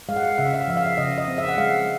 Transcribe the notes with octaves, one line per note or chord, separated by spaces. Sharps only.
G#3 F5
F#5
F5
C#3 E5
F5
E5
F5
F3 E5
F5
E5
C#3 D#5
D#5
C4
E5
F#5
G#3 F5